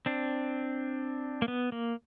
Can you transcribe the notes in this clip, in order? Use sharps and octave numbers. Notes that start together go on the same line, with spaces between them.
C4 D4
A#3
B3
A#3